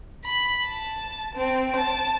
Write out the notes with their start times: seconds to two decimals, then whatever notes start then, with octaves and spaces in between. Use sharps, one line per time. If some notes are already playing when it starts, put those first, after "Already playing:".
0.25 B5
0.64 A5
1.36 C4
1.77 A5